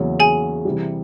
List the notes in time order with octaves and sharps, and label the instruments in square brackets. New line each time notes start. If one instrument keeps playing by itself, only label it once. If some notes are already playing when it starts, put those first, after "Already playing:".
Already playing: [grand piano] E2 C#3 F#3 A#3 C#4
[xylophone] G#4 G#5
[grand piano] C3 E3 G3